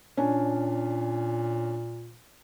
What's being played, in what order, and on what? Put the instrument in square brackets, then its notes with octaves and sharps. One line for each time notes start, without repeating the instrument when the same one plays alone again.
[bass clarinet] A#2 [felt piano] C#4 D4